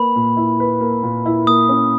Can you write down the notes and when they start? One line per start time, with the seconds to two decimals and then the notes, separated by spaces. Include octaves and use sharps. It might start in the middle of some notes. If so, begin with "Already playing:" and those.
Already playing: A#3 B4 B5
0.16 A#2
0.37 E4
0.60 B4
0.81 A#3
1.03 A#2
1.26 E4
1.47 A#3 D#6
1.69 C#4